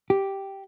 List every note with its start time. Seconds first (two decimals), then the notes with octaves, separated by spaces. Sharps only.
0.10 G4